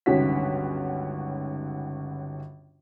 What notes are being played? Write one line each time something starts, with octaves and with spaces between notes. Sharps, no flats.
G1 C#2 D#3 C#4 F#4 B6